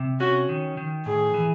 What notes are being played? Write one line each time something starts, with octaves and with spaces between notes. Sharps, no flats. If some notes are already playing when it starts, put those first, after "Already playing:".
Already playing: C3
C#4 F#4
D#3
D#3
A2 G#4
E3